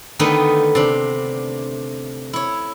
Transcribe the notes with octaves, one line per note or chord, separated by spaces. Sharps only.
D3 D#3 A3 B3 D#4
C3 D4
E4 C#5